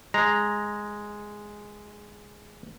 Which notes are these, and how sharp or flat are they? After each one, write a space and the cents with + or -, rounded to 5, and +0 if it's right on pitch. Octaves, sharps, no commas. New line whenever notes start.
G#3 +0 A#5 +0